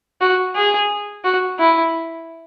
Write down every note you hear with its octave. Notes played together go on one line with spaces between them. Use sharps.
F#4
G#4
F#4
E4